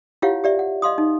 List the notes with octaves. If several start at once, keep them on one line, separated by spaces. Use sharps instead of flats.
E4 F4 G4 C#5 F5 F#5
G4 D5 E5
F#5
D#5 F5 C6 D#6
D#4